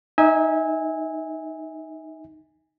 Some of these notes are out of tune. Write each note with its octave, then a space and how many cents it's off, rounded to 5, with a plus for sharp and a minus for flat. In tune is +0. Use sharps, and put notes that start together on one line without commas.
D#4 +5 E5 -30 G#5 -15